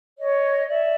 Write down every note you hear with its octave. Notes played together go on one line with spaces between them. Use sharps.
C#5 D#5
D5 E5